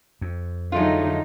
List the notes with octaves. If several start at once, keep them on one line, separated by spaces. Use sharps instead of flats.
F2
D3 F#3 G#3 A3 D#4 F4